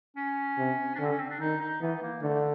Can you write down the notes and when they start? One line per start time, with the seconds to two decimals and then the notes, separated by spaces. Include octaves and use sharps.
0.16 C#4
0.58 C3
0.95 D4
0.99 D3 C#4
1.05 C4
1.09 C#4
1.19 C4
1.30 D4
1.40 D#3 D#4
1.60 D#4
1.81 E3 B3
2.02 A#3
2.22 D3 A3